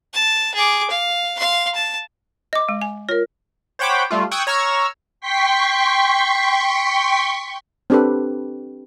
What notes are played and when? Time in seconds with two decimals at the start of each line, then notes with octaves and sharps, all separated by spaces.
0.13 A5
0.54 G#4 D6
0.90 F5
1.37 F5 C6
1.75 A5
2.53 D#5 D6
2.69 G#3
2.82 G#5
3.09 F4 A#4 C#5
3.79 C5 C#5 F#5 G5 B5 D6
4.11 G3 A3 F4
4.31 G5 C#6 D#6 E6 F#6 G#6
4.47 C#5 A#5 E6 F6 G#6
5.21 G5 C6 C#6 B6
7.90 C4 D4 G4 A4 B4